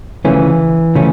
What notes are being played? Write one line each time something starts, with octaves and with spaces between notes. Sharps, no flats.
D2 C#3 E3 F3 A3 C#4
C#3 F3 A3 C#4